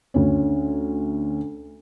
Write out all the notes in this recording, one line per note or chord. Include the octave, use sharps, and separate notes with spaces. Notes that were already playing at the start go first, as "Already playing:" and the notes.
D2 C#4